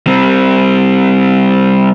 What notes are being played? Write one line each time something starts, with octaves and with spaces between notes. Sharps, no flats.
G3 C4